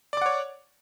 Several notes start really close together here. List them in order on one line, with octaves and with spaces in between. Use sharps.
D5 D6 F#5 C#5